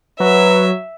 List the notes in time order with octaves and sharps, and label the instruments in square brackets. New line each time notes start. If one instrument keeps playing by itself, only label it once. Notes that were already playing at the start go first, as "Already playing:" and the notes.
[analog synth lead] F#3 [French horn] B4 [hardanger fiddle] E5